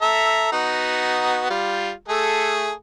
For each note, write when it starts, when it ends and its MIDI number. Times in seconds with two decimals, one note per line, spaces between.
0.02 0.51 69
0.02 0.51 76
0.02 0.51 82
0.52 1.46 59
0.52 1.46 63
0.52 1.46 66
1.50 1.91 55
1.50 1.91 65
2.08 2.72 57
2.08 2.72 68
2.08 2.72 69